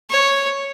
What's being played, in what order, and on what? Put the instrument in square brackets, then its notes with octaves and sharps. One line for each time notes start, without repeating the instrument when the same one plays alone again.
[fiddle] C#5